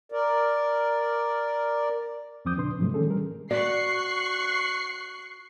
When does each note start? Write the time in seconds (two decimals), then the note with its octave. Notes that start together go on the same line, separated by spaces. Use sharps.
0.12 A#4 D5
2.45 E2 F3 C4 D6 D#6 G6
2.57 A#2 C#3 D4 B4 C6
2.78 G#2 C3 F3 F#3 G#3 A3
2.94 D#3 A3 C#4 G#4 A4
3.07 G3 A#4
3.51 F#4 D5 C#6 F#6 C7